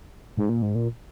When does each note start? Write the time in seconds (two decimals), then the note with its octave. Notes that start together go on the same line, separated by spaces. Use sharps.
0.37 G#2
0.49 A#2
0.62 G#2
0.75 A#2